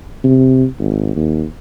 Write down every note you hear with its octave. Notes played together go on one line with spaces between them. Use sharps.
C3
G#1
D#2